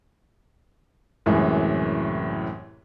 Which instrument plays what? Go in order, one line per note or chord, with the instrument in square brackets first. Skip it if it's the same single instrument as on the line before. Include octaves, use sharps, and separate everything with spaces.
[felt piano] C2 F#2 A2 E3 G#3